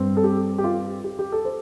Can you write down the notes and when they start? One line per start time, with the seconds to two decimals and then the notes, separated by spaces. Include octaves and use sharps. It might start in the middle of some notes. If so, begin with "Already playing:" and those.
Already playing: G2 G3 C4
0.17 A4
0.24 G4
0.58 G4
0.64 F4
1.04 G4
1.19 G4
1.32 A4
1.45 C5